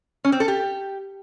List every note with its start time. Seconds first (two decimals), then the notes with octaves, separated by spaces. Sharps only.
0.25 C#4
0.32 C4
0.40 A4
0.48 G4